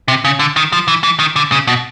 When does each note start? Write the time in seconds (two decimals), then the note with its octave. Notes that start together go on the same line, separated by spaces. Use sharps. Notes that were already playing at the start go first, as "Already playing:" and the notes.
0.08 C3
0.25 C#3
0.39 D3
0.57 D#3
0.73 F3
0.88 E3
1.04 E3
1.19 D#3
1.36 D3
1.52 C#3
1.68 B2